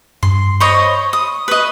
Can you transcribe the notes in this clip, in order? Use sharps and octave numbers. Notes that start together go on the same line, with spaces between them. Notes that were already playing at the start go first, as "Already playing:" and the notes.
G2 C6
C5 C#5 D#5 B5 C#6
D#6
B4 D#5